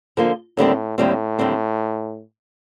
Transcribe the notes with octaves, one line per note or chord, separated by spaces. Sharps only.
D3 F3 A#3 F4
D#2 A2 D3 G3 C4
D#2 A2 D3 G3 C4
D#2 D3 G3 C4